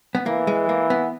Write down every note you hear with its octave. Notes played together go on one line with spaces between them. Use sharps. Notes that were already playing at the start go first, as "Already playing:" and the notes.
B3
E3 A#3
G#3
A#3
B3